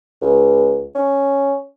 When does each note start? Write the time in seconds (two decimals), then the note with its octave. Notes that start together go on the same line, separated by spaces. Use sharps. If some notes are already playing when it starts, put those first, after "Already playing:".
0.22 C#2
0.95 C#4